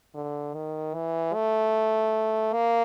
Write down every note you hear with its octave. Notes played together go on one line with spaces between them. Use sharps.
D3
D#3
E3
A3
A#3